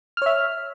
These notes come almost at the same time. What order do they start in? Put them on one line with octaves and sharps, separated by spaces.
F6 C#5 E5